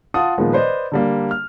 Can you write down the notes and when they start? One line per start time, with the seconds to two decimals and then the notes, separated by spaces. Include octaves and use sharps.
0.14 F4 F#5 A5 D#6
0.38 A#2 D#3 F3 G#3 B3
0.53 B4 C5 D5 D#5
0.92 D3 G3 A#3
1.31 F6